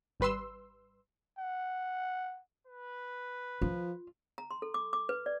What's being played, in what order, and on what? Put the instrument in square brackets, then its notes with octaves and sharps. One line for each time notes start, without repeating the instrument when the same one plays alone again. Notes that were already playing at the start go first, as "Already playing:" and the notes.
[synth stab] G#1 G3 B4 C6 E6
[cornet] F#5
[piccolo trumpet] B4
[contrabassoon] F3 [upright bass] F4
[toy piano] A#5
C6
A4
D6
D6
B4
D5